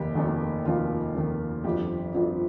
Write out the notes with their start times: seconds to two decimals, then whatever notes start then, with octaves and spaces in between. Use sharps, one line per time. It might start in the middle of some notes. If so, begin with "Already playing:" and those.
Already playing: F1 D#2 D#3 G4
0.15 F1 D#2 D#3
0.65 F1 D#2 D#3 F4
1.15 F1 D#2 D#3
1.64 G1 F2 F3 G4
2.14 G1 F2 F3